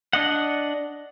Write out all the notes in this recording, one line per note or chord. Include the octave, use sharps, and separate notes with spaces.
D4 D#5 F#5